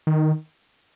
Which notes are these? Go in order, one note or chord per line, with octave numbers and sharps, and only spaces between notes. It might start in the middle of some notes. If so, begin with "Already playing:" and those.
D#3